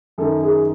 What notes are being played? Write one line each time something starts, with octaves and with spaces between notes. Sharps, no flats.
F#2 D#3 A4
G#4